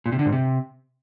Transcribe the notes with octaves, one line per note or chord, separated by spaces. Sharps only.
A#2
C3
D3
G#2
C3